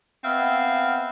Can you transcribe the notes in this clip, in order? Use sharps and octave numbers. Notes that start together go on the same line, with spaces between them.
B3 C4 E5 F5